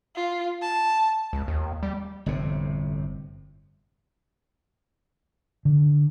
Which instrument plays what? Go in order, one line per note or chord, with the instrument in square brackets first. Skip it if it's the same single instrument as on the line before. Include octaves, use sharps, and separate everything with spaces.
[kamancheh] F4
A5
[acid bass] C#2
D#2
G3
[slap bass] G1 F2 A2 C3
[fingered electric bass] D3